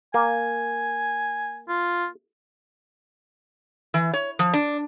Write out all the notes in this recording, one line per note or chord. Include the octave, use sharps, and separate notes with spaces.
A#3 G#5
F4
E3
C#5
F3
D4